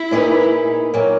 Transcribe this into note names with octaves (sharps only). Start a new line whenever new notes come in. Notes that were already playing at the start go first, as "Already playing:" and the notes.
Already playing: E4
A#2 A#3 D#4 G#4 B4
A#2 F#3 A#3